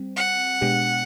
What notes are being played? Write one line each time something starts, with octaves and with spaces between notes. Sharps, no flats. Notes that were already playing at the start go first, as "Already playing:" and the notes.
Already playing: G3 C4
F#5
B2 G#3 B3 D4 G4